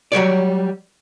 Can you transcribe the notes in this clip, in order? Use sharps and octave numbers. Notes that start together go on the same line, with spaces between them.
F#3 G3 C#5 D5